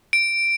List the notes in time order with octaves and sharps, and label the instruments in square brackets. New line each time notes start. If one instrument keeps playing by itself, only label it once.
[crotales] D7